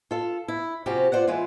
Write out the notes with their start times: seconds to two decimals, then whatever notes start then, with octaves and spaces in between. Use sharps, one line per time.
0.11 F4 A4
0.48 E4
0.86 C3 F3 C4 C#4 F#4 G4
1.12 F4 C5 D5 F#5
1.28 E3 G#3 E4 F4